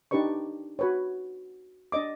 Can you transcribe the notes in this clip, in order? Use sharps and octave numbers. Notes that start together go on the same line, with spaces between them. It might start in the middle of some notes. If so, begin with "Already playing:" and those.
D4 D#4 G4 B4 D5 C#6
F#4 B4 C#5
D4 D5 D#5 D6